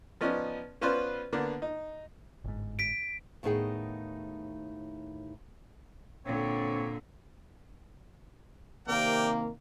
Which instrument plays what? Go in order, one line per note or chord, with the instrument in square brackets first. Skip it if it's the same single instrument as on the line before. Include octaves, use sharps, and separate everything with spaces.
[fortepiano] F3 B3 C#4 D#4 D5
B3 C#4 F4 B4 C5 D5
D3 A#3 B3 D4
D#4
[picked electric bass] G1 G#2
[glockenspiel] B6 D7
[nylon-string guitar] D#2 A2 B3 D#4 G#4 G5
[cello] A#2 D3 [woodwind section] C4 C#5
[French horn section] C3 D#3 A#3 [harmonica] A#4 D5 G5